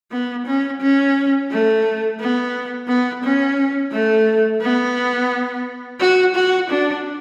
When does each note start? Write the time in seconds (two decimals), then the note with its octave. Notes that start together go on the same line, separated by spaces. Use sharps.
0.11 B3
0.46 C#4
0.81 C#4
1.51 A3
2.20 B3
2.88 B3
3.23 C#4
3.92 A3
4.62 B3
6.00 F#4
6.35 F#4
6.70 D4